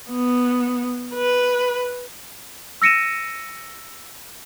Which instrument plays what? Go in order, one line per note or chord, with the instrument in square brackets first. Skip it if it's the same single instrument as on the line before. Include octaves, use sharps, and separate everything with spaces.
[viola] B3
B4
[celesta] E6 A#6 C#7 D#7 E7